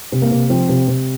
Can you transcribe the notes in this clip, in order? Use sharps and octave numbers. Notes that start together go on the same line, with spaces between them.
C3
A#3
C3
F3 C4
C3
C3